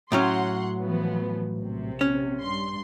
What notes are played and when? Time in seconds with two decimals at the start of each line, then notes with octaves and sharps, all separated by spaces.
0.12 A2 F#3 C#4 F#5 C6
0.81 E3 F3 B3
1.55 A#1 C3
2.01 C#4
2.40 G2 C6